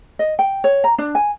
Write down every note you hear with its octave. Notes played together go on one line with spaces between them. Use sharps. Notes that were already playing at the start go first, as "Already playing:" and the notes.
D#5
G5
C#5
A#5
D4
G#5